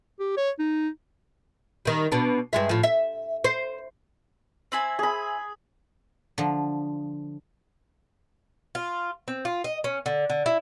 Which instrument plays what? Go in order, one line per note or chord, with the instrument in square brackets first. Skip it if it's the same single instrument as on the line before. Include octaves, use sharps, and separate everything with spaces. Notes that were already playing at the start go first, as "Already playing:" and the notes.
[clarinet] G4
C#5
D#4
[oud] D#3 G3
B2 D4
G2 G#3 E5
A2 F3
E5
C5
[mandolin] C4 E4 G#5
[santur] G#4 B5
[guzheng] D3 F3
[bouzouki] F4
C4
F4
D#5
C#4
D3
D3
E4